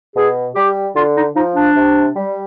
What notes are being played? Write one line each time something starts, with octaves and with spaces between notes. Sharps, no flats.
B2 G#4
G3 G4
D3 F4
D#4
F3 D#4
D4
C3
G3